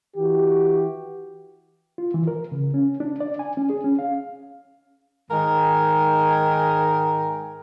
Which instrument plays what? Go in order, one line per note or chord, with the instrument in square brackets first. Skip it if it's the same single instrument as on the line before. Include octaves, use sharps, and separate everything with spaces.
[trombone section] E3 F#4 G4
[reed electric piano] F4
E3
A#4
C#3
C#4
D4
D5
G#5
C#4
G#4
C#4
F5
[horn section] G#2 D#3 D#4 A#4 G5 G#5